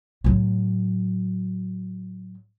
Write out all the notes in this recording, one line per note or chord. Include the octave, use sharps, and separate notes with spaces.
A2 F#3